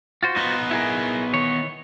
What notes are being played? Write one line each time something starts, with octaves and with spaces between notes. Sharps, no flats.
F4 F#4 C5
B3 D#4
E4 G#4 A#4
D#3 E3 C#5